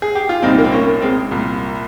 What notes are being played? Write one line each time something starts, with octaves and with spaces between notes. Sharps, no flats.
G#4
G4
F4
C2 A#2 C4 D#4
A#3
C4
A#3 C#4
G#3 C4
C2 A#2